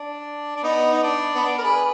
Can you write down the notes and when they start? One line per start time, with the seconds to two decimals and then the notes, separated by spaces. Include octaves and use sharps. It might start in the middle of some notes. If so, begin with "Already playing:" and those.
Already playing: D4
0.56 D4
0.63 B3 D#4
0.93 D#4
1.03 D4
1.35 B3
1.43 D4
1.58 A#4
1.63 G#4 B4